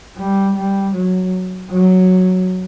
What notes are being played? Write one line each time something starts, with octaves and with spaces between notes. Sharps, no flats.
G3
G3
F#3
F#3